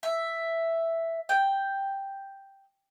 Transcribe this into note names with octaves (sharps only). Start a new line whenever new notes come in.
E5
G5